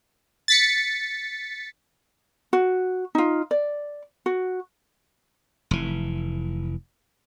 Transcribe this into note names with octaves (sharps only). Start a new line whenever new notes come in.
A6 B6 C#7
F#4
D#4 F4
D5
F#4
F1 E3